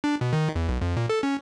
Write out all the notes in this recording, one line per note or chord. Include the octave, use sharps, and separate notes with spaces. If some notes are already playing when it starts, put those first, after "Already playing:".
D4
B2
D#3
E2
B1
F2
A#2
A4
C#4